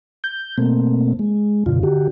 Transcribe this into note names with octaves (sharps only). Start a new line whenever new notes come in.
G6
B2 A3 A#3 C4
G#3
F#2 B2 D3 F4
D3 F#4 G4